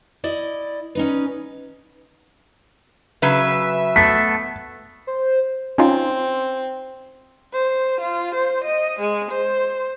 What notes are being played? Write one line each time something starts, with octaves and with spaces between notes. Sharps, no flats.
E4 D5 D#5
C#4 D#4 B4
C#3 F#3 B4 E5
A3 B3 A4 B6
C5
C4 C#4 D#4 F4
C5
F4
C5
D#5
G#3
C5